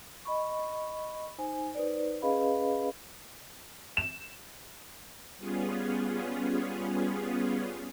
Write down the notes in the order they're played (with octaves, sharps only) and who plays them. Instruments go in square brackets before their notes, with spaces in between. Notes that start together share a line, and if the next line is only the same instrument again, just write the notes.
[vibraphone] D#5 B5 C#6
D#4 C5 G#5
D#4 B4 C5 D5
C#4 G#4 B4 D#5 F5 B5
[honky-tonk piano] E7
[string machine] G3 B3 C#4 F4 G#4